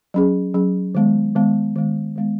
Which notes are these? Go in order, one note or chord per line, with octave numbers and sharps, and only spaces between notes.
F#3 C#4 G#4
F#3 C#4 G#4
D#3 G#3 B3
D#3 G#3 B3
D#3 G#3 B3
D#3 G#3 B3